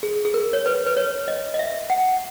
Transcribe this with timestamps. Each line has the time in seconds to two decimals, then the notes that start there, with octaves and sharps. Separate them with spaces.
0.03 G#4
0.25 G#4
0.34 A#4
0.53 C#5
0.66 B4
0.86 B4
0.97 C#5
1.28 D#5
1.54 D#5
1.59 E5
1.90 F#5